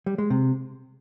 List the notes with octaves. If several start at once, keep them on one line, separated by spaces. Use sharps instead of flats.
G3
G#3
C3